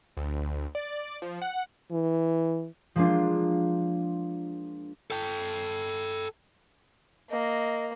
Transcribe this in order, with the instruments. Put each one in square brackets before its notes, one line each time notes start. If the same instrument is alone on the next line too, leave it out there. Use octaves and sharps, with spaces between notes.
[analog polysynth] D2
D5
F3
F#5
[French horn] E3
[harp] F3 G#3 A#3 D4 F4
[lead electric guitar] A4 G5
[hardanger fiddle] A#3 [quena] D#5